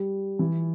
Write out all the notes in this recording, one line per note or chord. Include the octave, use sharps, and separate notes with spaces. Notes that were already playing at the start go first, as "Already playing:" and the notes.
Already playing: G3
E3